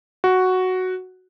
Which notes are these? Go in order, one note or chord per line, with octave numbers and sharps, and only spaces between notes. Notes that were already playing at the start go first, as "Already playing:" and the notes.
F#4